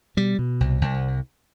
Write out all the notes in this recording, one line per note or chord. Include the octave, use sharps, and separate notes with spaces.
B2 G3
B2
C2
C2